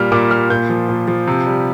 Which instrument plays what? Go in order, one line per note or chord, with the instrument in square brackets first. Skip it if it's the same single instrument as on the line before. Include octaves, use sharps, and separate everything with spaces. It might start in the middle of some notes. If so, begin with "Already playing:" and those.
Already playing: [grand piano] A#2 G3 F6
A#2 D6
G3 F6
A#2 G6
F3
A#2
F3
C3
G3